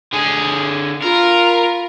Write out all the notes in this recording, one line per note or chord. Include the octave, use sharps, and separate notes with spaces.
D3 G#4
F4 A#4 B5